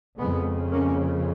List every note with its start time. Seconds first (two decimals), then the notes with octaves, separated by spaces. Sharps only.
0.18 F2 C#3 G#3 B3
0.72 A#3 C#4